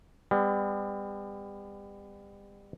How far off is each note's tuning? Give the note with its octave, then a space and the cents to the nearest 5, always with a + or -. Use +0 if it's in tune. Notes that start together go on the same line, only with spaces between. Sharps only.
G3 +35 B3 +40